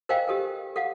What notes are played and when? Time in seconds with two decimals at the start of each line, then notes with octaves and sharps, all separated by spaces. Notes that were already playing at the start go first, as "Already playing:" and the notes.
0.09 A#4 C5 D#5 F5 G5 G#5
0.28 G4 A4 A#4
0.76 A4 F5 F#5